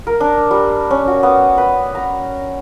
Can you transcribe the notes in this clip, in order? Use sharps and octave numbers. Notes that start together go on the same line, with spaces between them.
A#4
D4
G3
C#4
F#4
B3
B4
A#5